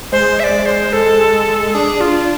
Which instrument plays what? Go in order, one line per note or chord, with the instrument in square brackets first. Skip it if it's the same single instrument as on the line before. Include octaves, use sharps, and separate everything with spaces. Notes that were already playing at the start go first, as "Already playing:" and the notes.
[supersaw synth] G#3 [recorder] C5
[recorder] E5
D5
C5
A4
[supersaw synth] D4 [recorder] G#4
[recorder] F4